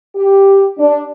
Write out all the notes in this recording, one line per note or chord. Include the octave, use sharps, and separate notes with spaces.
G4
D4